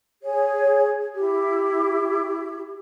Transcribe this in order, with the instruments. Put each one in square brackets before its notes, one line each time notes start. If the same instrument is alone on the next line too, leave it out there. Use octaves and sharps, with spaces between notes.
[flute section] G#4 C#5
[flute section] E4 [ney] G4